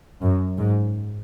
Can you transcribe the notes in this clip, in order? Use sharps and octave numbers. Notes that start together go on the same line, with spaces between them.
F#2
G#2